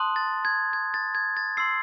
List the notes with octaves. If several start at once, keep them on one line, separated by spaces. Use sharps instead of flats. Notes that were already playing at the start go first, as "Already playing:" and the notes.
Already playing: A5 C6 D#6 F#6
A6
G#6
G#6
A6
G#6
A6
C6 E6 C7